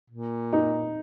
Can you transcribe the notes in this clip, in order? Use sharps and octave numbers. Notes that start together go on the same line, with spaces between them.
A#2
D#4